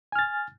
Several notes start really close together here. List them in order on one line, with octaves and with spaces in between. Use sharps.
G#5 F6 A6